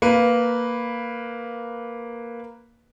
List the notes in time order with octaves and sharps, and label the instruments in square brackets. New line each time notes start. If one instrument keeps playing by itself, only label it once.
[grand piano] A#3 B4 D#7